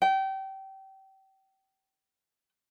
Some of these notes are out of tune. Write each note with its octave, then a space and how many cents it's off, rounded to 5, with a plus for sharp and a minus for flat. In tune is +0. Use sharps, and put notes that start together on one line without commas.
G5 -25